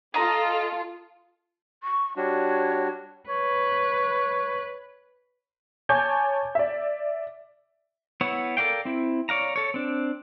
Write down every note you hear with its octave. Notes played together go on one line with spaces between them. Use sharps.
F4 A4 D#5 A#5
C#6
G3 D4 F#4 C#5
B4 C#5
C#5 G#5 A5 D6 G6 G#6
D5 E5
B3 E4 C#5 F#5
A4 A#4 D5 F5 G5
C4 E4
C#5 D5 F5 A#5
A4 C#5
C4 D4